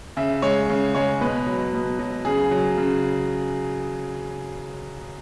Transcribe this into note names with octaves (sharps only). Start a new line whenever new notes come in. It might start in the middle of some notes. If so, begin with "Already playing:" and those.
C#3 E5
G#3 C#5
C#3
G#3 C#5
B2 B4
F#3
B2
F#3
C#3 G#4
F#3
C#3